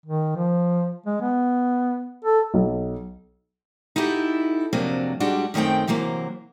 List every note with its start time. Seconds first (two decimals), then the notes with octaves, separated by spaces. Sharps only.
0.06 D#3
0.36 F3
1.06 G#3
1.21 B3
2.24 A4
2.54 B1
3.96 D#4 E4 F#4 G4 A4
4.73 F2 C3 F#3 A#3 D4
5.20 G3 G#3 D4 F#4
5.54 F#2 D#3 A3 C4 G5
5.87 C3 E3 F#3 A#3 C5